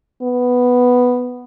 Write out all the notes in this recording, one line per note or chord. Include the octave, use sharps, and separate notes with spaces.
B3